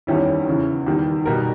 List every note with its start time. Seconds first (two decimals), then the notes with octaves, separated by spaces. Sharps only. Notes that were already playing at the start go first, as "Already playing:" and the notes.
0.07 E2 D#3 G3 C#4 E4
0.46 E2 C#3 E3
0.86 E2 D#3 G3
1.25 B2 G3 B3 D#4 A#4